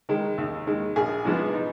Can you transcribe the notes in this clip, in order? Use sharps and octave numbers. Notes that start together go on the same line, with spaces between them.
D#3 G#3
D#2
D#3 G#3
A#1 G#4
G#2 F3 G#3 B3
D#4